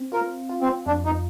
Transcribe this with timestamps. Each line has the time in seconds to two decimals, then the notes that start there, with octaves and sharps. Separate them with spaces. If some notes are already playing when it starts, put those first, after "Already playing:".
Already playing: C4
0.12 F4 A#4
0.49 F4
0.61 C4
0.86 F2 D4
1.05 D#4